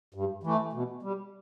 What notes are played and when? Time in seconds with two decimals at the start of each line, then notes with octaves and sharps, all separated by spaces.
0.14 G2
0.43 E3 A3
0.73 B2
1.02 G3